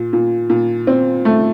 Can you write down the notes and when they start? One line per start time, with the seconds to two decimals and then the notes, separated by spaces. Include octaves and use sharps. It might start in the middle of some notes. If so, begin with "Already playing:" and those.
Already playing: A#2
0.13 A#2
0.50 A#2
0.87 C4
1.25 A3